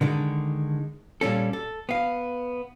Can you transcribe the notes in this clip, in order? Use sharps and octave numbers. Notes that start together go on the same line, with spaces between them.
D3 D#3 G#3
A#2 G3 C#4 A4
A4
B3 F5